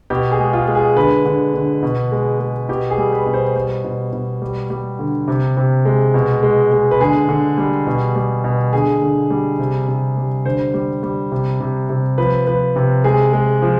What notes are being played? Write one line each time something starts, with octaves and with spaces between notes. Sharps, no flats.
B2 G4
G#4
G#3
F4
G#3
G#4
D3 B4
D3
D3
B2
G#3
G#3
B2 G4
G#4
G3
B4
B2
C5
G3 C5
B2
B2
G3
G3
D3
C3
C3
G#3
B2
G#3
G#3
B4
D3 G#4
D3
G3
B2
G3
B2
D3 G#4
D3
G3
C3
C3
G3
D3 C5
G3
G3
C3
C3
C3
F3 B4
F3 B4
C3
G#3 G#4
G#3
F3